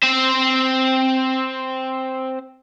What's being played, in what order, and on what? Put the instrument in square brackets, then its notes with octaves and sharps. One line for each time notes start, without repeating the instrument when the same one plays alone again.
[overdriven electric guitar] C4 C5